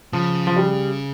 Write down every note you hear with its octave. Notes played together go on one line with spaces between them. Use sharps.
C#3 F3
F3
G3